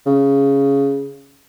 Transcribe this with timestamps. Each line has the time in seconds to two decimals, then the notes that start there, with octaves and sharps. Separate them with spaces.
0.06 C#3